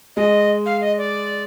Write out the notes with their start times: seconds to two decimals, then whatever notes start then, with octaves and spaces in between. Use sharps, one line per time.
0.16 G#3 D#5
0.66 F5
0.81 D#5
0.98 D5